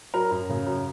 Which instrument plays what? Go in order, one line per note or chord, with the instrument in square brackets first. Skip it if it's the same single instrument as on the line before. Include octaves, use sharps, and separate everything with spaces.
[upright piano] F#3 A#4
F#2
C#3
F#2